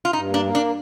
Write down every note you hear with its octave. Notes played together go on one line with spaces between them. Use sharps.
F4
G2 D#4
A#3
D4
A#3
D4